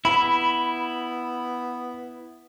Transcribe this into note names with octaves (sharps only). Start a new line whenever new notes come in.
B3 E4 B5